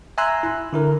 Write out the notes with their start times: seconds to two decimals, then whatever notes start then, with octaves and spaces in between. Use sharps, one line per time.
0.18 E5 G#5 A#5 C6 E6 F#6
0.43 E4
0.73 D3 E4 A#4